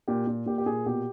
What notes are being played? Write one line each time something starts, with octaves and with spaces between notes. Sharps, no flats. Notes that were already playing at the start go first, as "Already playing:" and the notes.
A#2 G4
A#2
A#2 G4
G4
A#2 G#4
B2 G4